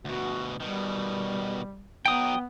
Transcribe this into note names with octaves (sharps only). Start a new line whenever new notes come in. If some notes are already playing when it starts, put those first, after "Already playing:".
D2 B2 F#4
B2 D#3 G3
F#3 B3 D#4 G5 D#6